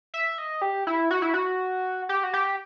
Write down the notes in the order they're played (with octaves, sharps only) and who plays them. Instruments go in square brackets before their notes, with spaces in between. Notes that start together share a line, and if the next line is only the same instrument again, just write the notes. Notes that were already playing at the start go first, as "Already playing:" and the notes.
[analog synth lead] E5
D#5
G4
E4
F#4
E4
F#4
G4
F#4
G4